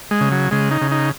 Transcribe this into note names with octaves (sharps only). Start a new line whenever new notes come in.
G#3
C#3
F#3
C#3 G#3
D#4
C#3
D#4